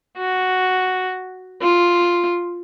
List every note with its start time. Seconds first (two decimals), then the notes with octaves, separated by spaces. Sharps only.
0.17 F#4
1.62 F4